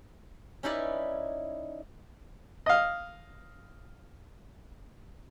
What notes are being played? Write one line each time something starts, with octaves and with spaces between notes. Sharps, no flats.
C#4 D#4 E4 B4 D5
D#5 F5